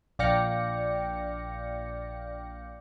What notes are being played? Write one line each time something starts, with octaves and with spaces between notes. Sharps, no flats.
A#1 D5 F5 G5 A#6 C#7